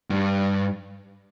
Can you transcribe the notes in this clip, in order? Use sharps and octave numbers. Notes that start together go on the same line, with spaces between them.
G2